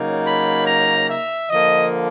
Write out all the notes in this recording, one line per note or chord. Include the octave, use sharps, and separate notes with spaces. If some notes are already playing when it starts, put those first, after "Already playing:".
Already playing: C#3 F#3 A#3 D#4
B5
A#5
E5
D3 F3 A#3 D#5